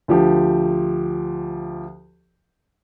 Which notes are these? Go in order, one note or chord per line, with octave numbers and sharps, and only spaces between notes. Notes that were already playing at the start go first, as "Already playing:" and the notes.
D2 F3 G4